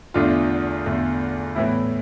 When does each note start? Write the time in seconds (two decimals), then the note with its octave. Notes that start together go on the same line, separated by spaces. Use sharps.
0.14 E2 D3 A3 D4 F4
0.86 E2 D3 A3
1.55 A2 E3 B3 E4